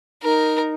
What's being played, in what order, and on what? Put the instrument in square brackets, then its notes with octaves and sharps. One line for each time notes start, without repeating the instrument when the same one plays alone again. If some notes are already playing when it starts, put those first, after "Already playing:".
[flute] D#4 [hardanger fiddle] A#4